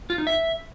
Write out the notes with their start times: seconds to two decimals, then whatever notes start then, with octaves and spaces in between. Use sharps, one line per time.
0.10 F4
0.18 D#4
0.27 E5